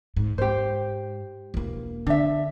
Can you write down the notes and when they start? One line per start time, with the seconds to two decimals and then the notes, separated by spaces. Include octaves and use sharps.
0.17 G#2
0.38 G#2 G4 C5
1.54 E1 A#3
2.07 D3 D4 E5